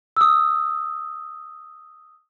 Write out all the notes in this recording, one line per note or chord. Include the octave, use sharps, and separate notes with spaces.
D#6 E6